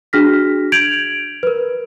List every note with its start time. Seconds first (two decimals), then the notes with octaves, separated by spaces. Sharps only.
0.13 D4 F#4 G#4 F6 A#6 B6
0.72 G6 G#6 D7 F7 F#7
1.43 A#4 B4